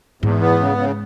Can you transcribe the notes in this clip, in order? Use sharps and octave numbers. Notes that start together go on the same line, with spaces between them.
E2 G#2
B3
C#3
C#3